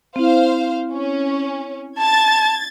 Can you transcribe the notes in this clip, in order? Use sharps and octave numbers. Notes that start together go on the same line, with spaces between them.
C4 E4 C5 F5
C#4
A5 G#6 A6